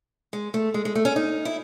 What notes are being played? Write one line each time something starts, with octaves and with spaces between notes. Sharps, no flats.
G#3
A3
G#3
G#3
A3
C#4
D#4
E4